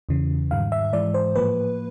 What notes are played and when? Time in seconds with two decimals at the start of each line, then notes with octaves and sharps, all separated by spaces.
0.09 E2 C#3 E3
0.51 G#2 D#3 G3 F5
0.72 E5
0.93 G#2 E3 G#3 D5
1.14 C5
1.36 A2 F3 A#3 B4